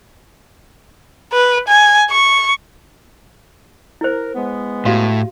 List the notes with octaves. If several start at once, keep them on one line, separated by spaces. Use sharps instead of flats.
B4
G#5
C#6
E4 A#4 C5
G#3 B3
A2 F#4 G4 F5